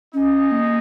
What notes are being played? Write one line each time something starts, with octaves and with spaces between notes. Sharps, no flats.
C#4 D#4 G#4 D#5
A#3